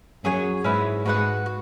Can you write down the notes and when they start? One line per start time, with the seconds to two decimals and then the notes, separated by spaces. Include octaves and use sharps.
0.24 F#2 F#3 G#4 C#5 G#5
0.64 G#2 G#3 C#4 E4 B4
1.05 G#2 G#3 F#4 B4 F#5
1.46 F#4